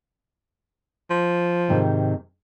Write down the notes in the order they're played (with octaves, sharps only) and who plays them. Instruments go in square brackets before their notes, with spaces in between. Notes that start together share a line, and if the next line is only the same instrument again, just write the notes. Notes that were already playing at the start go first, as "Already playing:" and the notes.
[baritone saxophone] F3
[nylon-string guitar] G#2 C3 D#3